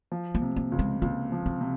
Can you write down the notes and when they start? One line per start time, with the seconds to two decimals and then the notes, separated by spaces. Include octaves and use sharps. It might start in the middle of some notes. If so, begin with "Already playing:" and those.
0.12 F3
0.35 A#3
0.42 C3
0.56 A#3
0.72 C#2
0.79 G#3
1.02 C#2 A#3
1.32 F3
1.46 C4
1.61 C3